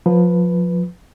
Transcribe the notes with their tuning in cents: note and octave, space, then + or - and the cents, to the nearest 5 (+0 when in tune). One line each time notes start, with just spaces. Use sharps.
F3 +25 B4 +0